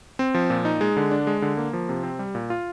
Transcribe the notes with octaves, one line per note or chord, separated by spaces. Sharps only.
C4
F3
A#2
D#4
G#3
D3
D4
G#3
D3
A#3
F3
C3
C4
G3
A#2
F4